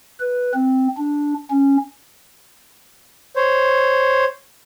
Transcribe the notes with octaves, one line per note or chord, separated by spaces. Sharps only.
B4
C4
D4
C#4
C5 C#5